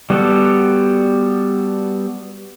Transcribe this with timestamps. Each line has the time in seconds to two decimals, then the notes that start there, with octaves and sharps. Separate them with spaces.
0.10 G3 B3 F#4 G4 A4